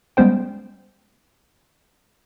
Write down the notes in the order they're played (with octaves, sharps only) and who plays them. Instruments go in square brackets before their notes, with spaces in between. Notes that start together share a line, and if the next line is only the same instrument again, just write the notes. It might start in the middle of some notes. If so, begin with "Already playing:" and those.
[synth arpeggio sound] G3 G#3 B3 C#4 C5 G5